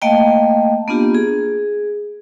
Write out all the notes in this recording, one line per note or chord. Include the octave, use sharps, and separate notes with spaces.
A3 A#3 D#5 F5 G5 A5
A#3 B3 D4 F4 G4
G#4